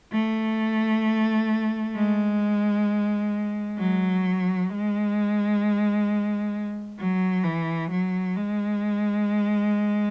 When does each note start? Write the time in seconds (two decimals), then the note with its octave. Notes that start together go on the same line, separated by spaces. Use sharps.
0.12 A3
1.95 G#3
3.78 F#3
4.69 G#3
6.98 F#3
7.44 E3
7.91 F#3
8.36 G#3